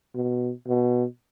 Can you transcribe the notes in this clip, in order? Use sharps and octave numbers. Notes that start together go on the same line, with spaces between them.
B2
B2